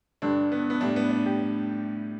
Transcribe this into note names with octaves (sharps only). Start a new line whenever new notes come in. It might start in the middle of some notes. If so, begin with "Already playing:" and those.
G2 D3 G3 D4
B3
B3
A2 G3 D4
B3
D4
G4